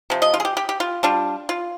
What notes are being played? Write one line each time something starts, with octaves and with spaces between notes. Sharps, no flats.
C3 F3
D#5
F4
G#4
G4
G4
G4
F4
G3 D4 F4
F4